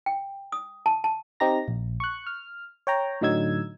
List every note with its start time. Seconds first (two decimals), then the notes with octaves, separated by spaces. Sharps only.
0.06 G5
0.52 D#6
0.86 A5
1.04 A5
1.40 C4 D#4 G4 A#5 A#6
1.68 A#1
2.00 C#6 F#6
2.27 F6
2.87 C#5 G5 A#5
3.21 A2 D3 F#3 D#4 E6 G#6